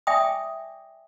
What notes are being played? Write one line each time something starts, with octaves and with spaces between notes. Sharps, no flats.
D5 E5 G5 G#5 D6 D#6